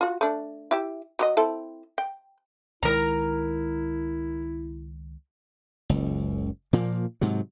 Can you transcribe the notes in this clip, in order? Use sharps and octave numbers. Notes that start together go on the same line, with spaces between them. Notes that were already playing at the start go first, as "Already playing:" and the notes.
F4 F#4
A3 D4
E4 G4 E5
F#3 G4 D#5
C4 E4 A4
G5
C#2 D#3 G#3 E4 A#4 A#5
F#1 C#2
A#2 F3 A#3
G#2 C3 F#3